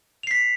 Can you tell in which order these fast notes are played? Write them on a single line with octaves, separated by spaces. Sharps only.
F7 C7 B6